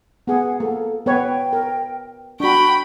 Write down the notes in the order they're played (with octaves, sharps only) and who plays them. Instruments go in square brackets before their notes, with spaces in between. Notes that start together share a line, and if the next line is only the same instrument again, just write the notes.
[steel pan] B3 G#4 [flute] F#5
[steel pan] A#3 [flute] A4
[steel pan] B3 B4 C#5 [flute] G5
[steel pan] A#4
[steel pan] D4 F#4 [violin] G5 B5 [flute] C#6